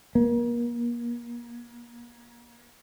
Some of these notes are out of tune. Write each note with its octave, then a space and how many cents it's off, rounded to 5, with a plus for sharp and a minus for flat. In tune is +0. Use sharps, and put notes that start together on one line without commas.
A#3 +35